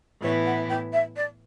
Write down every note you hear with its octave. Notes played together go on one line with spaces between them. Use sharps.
A2 E3 B3 E4 C#5
F#5
G5
E5
D5